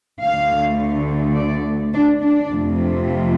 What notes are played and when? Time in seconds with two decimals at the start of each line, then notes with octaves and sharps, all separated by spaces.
0.21 D2 D3 A3 F5
1.36 D5
1.93 D4
2.21 D4
2.50 F2 C3 A3
3.07 F4